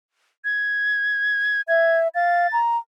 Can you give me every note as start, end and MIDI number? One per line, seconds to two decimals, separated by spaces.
0.45 1.61 92
1.68 2.08 76
1.68 1.99 92
2.15 2.47 77
2.15 2.59 93
2.52 2.77 82